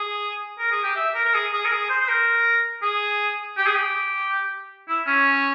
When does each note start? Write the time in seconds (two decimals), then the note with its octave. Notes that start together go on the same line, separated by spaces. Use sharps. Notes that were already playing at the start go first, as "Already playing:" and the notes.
Already playing: G#4
0.59 A#4
0.71 G#4
0.83 G4
0.96 E5
1.15 A#4
1.25 A#4
1.33 G#4
1.53 G#4
1.65 A#4
1.71 G#4
1.89 C5
2.01 C5
2.08 A#4
2.82 G#4
3.57 G4
3.66 G#4
3.75 G4
4.88 E4
5.07 C#4